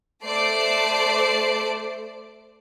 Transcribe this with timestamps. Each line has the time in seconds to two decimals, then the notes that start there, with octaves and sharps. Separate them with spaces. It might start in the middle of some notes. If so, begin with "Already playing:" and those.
0.25 A3 C5 D5 A5 C7 D7